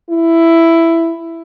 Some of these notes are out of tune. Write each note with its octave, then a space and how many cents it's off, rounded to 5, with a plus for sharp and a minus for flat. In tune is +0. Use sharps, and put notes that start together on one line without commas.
E4 +10